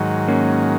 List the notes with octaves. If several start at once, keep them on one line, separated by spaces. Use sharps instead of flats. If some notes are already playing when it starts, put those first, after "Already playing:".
Already playing: G#2 D#3 F#3
A#3 C#4